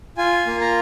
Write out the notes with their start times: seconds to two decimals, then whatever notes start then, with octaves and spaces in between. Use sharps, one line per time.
0.18 F4 G#5
0.47 A#3
0.61 A#5